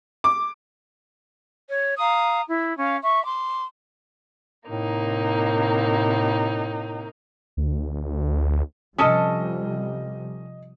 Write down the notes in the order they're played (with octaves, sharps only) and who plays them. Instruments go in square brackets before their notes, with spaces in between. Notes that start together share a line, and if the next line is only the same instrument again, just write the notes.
[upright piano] D6
[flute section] C#5
F5 A#5 D#6
E4
C#4 F5
E5 C#6
C6 D6
[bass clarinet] A2 [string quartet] C3 A#3 D#4
[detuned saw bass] D2
[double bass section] C3 F3 G3 [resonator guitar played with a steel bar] C#4 A4 A5 [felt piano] D#5 D#6